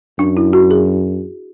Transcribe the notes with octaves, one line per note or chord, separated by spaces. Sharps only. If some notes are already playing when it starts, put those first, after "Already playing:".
F#2 D4
E4
F#4
G#4